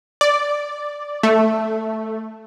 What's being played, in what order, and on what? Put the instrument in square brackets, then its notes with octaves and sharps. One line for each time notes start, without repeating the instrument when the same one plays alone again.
[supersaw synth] D5
A3